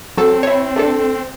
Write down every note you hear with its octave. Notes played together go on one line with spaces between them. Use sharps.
F#3 C4 A4
E4 C#5
A3 D4 A4